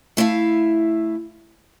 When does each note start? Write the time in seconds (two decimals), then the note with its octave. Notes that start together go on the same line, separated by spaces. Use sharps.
0.17 A3 E4 E5 F5